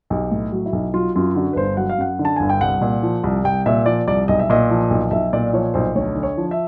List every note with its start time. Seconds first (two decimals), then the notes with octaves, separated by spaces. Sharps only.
0.10 B1 G4
0.31 A2
0.52 F#3
0.66 E4
0.73 B1
0.94 F#3 F4
1.16 F#2 F4
1.36 D3 F#4
1.53 B4
1.56 G1 C5
1.77 F#3 F#5
1.89 F5
1.98 F#2 F#5
2.19 D3
2.25 A5
2.36 G1 G#5
2.50 G5
2.61 C2 F#5
2.81 A#2
3.03 F3
3.24 C2
3.44 C2 G5
3.66 A#2 E5
3.86 F3 D5
4.07 C2 D5
4.28 B1 D#5
4.39 E5
4.50 A#2 D#5
4.70 F3
4.90 B1
5.11 B1 E5
5.33 A#2 D5
5.53 F3 C#5
5.74 B1 C5
5.95 D2 C#5
6.15 D3
6.23 C#5
6.37 F3
6.51 E5